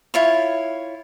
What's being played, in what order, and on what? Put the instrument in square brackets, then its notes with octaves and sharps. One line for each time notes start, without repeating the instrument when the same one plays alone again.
[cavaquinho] E4 F4 C#5